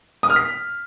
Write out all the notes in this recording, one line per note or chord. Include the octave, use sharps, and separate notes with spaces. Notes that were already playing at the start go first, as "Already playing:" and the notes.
D#6
F6
B6